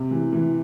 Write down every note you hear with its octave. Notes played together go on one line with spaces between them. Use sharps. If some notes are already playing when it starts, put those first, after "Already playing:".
Already playing: C3
E3
E3